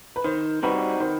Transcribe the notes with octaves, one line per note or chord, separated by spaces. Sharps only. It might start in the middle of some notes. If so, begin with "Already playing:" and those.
B4
D#3 C5
G3 C4 D#4 F#4 B4
D#3 C5